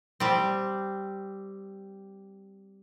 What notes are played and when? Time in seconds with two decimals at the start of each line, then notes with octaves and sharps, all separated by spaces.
0.20 G3 C4